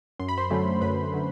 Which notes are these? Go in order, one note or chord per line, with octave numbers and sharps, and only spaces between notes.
F#2 C6
B5
C5 C6
D3 F#3 A3 C#4
F#2 B4 B5
D3 F#3 A3 C#4